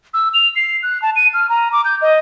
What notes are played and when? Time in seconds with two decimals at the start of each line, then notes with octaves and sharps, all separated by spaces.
0.14 E6
0.34 F7
0.56 C7
0.83 F#6
1.02 A5
1.16 D#7
1.34 F6
1.49 A#5
1.72 D6
1.85 G6
2.02 D#5